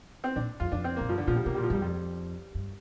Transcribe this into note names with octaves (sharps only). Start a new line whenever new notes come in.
C4
A#2 D4
F2 F4
F2 D4
C4
A#3
A#2
G2 F3
D3
A#2 F3
G3
C3 A#3
G3
A#2
F3
G2 G3
F2 G3
G2